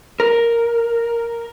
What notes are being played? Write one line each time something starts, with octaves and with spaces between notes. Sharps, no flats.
A#4